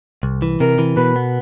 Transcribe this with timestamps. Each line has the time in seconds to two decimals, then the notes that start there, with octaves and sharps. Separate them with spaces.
0.23 C2
0.42 E3
0.60 C3 A#4
0.79 E3
0.97 B2 B4
1.16 B3